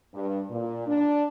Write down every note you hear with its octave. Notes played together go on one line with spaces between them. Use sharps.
G2
A#2
D4